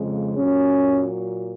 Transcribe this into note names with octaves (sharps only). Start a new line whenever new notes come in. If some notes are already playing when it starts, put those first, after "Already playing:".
Already playing: F2 C#3 G#3
A#2 F#3 C#4